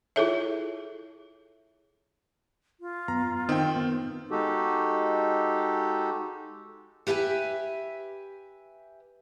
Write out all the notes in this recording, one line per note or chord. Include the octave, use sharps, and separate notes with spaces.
E4 F4 G#4 A4 C#5 E5
F4
F#2 B3 A#5
D#3 C4 G5
B3
G#3 D#4 F#4 G4 A4
G4 B4 E5 F5 G#5